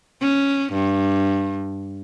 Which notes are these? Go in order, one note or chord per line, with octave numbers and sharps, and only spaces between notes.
C#4
G2